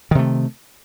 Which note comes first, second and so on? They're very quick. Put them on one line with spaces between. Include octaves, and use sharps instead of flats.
D#3 C3 A3